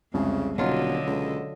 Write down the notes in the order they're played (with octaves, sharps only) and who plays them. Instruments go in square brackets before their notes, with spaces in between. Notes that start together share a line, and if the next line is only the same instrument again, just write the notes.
[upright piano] C2 G#3 [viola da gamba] F2 [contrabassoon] C#3
[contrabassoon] D#1 [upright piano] B2 [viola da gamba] D3 A4 D#5 [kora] F#3 F4
[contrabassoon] C#2